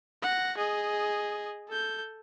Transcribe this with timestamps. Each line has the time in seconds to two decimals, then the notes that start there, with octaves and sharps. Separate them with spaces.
0.23 F#5 A#6
0.58 G#4 D#5
1.68 A4 G6